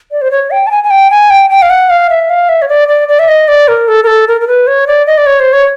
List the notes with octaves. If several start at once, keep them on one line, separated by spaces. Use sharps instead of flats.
D5
C5
C#5
G5
A5
G#5
G#5
G5
G#5
G5
G5
F5
F#5
F5
E5
F5
E5
C#5
D5
D5
D5
E5
D#5
D5
A#4
A4
A#4
A4
A#4
A#4
B4
C#5
D5
D#5
D5
C#5
C5
C#5